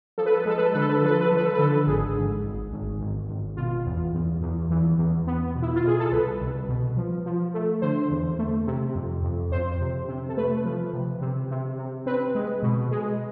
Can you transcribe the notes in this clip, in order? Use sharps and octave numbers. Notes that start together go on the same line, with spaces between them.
F3 A4
B4
A4
B4
G#3 A4
B4
A4
D3 B4
A4
B4
A4
F3 B4
A4
B4
F3 A4
B4
A4
B4
D3 A4
G#1 G#4
G#2
G#1
G#1
G#1
G#1
B2 F4
E2
E2
E2
E2
E2
B3
B2
E4
F4
B2 G#4
A4
C2 B4
C2
B2
F3
F3
A3
D3 C5
E2
A3
C3
F2
F2
F2 C5
C3
C3
A4
A3 B4
F3
C3
C3
C3
C3
C4 B4
G#3
B2
G#3